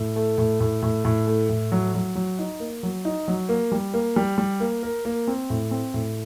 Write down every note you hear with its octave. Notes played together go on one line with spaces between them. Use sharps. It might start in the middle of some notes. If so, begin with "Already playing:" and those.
Already playing: A2
A3
A2
A2
A2
A2
A3
A2
F#3
F#3
F#3
D#4
A#3
F#3
D#4
F#3
A#3
G3
A#3
G3
G3
A#3
A#4
A#3
C4
A2
C4
A2